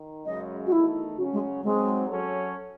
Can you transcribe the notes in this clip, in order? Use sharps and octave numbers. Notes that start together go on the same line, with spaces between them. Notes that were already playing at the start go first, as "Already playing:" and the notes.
Already playing: D#3
F#2 C#3 G#3 D#5
F#4
E2 D#3 A3 D#4 E4
C#3 F#3 C#4 F#4
G#3
G#2 F#3 G#3 C4
F#3 C#4 F#4 A4 C#5